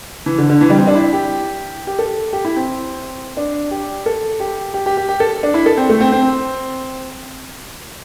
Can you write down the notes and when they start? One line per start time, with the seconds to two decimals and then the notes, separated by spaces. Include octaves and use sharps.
0.26 E3
0.38 D3
0.50 D3
0.61 E3
0.70 G3
0.78 C4
0.87 D4
0.95 E4
1.13 G4
1.87 G4
1.99 A4
2.33 G4
2.45 E4
2.56 C4
3.37 D4
3.71 G4
4.06 A4
4.40 G4
4.74 G4
4.86 G4
4.97 G4
5.09 G4
5.20 A4
5.43 D4
5.54 E4
5.66 A4
5.77 C4
5.89 A3
6.00 C4
6.12 C4